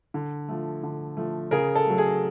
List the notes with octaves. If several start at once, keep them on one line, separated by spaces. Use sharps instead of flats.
D3
F3 A3
D3
F3 A3
C#3 G#4 A#4
A4
F#3 A3
G#4